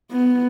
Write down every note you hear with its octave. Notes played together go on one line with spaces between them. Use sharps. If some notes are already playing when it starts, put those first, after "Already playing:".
B3